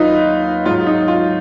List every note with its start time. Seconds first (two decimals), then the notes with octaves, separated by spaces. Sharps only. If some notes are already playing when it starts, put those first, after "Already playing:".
Already playing: D#2 F#3 D#4 F4 B4 D#5
0.66 G#2 F#3 F4
0.87 D#4
1.08 F4